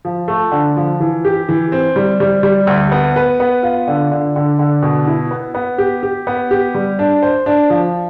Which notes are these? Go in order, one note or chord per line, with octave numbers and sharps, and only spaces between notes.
F3
A3
D3
F3
E3
G4
E3
C4
G3
G3
G3
D2
B3
B4
B3
F4
D3
D3
D3
D3
B2
E4
B3
B3
G4
G4
B3
G4
G3
D4
C5
D4
F3